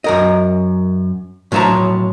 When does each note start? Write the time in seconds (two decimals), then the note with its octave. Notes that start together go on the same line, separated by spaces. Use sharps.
0.04 F#2 A#4 D#5
1.52 A2 F3 F#3 A5 A#5